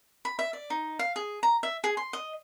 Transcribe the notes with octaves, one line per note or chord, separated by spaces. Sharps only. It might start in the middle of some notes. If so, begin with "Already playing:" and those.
B5
E5
D5
D#4
F5
G#4
A#5
E5
G#4
C6
D#5